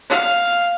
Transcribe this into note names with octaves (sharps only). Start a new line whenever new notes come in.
F5